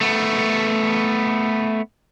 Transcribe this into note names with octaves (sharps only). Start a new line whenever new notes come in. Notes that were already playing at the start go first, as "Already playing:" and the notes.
A3 B3